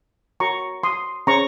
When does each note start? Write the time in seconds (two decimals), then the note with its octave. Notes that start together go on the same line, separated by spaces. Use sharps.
0.40 F#4 A#4 C#5 A#5 C#6
0.83 C6 D#6
1.27 C#4 G#4 C5 A#5 C#6